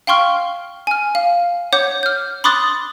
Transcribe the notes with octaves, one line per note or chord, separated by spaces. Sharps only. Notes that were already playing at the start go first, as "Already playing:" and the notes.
F5 G5 C6 C#6 F6
G#5 F6
F5
C#5 F#5 D6 G6
F6 G6
B5 C6 D6 D#6 F#6 A6